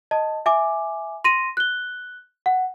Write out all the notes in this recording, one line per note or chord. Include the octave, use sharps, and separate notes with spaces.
D#5 A5
E5 G#5 D6
C6 A#6 D#7
F#6 G7
F#5